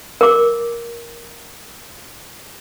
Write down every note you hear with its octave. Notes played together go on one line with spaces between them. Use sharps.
A#4 D6